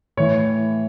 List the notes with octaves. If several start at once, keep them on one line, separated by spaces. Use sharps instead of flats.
A2 E3 C#5